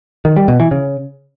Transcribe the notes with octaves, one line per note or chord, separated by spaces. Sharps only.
D#3
G3
B2
E3
C#3